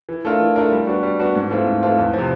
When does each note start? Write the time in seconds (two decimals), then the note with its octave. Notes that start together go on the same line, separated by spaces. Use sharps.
0.09 E3
0.25 A3 D4 F4 A#4
0.40 E3
0.56 A3 D4 F4 A#4
0.72 G3
0.87 B3 D4 F#4
1.03 G3
1.20 B3 D4 F#4
1.35 G#2
1.50 E3 A3 C4 F4
1.67 G#2
1.83 E3 A3 C4 F4
1.99 E2
2.14 C3 F3